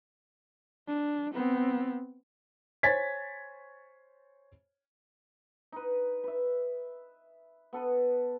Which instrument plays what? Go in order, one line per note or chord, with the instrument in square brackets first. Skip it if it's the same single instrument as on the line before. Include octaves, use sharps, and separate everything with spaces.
[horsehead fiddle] D4
B3 C4
[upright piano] C5 C#5 G#5 G#6 A6 B6
[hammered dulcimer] D#4 B4
B4 E5
B3 A4 B4